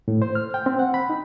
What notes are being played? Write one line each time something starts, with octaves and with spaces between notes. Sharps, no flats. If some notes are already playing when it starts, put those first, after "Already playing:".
A2
C5
F6
G5
C4
F#5
B5
D#4